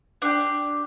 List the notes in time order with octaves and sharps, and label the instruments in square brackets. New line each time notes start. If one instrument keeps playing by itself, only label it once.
[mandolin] D4 F#4 G4